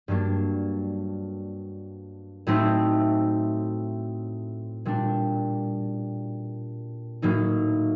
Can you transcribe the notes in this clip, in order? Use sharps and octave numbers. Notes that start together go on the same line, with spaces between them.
G2 F#3 A#3 D4
A2 F#3 A3 C4 D#4
A#2 G3 D4
A2 F#3 A#3 D#4